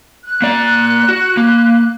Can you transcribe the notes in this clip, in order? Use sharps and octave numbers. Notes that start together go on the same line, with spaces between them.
F#6
A#3 D5
F#4
A#3